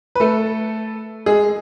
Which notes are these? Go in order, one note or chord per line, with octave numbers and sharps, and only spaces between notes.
B4
A3 A4
G#3 G#4